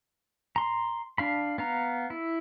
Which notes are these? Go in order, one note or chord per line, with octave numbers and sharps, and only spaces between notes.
A#5 C6
D4 F5 B5
B3 F5 A#5
E4